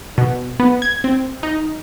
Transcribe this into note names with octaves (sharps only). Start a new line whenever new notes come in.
B2
B3
G#6
C4
D#4